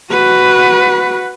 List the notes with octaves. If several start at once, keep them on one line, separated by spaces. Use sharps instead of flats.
F#4 B4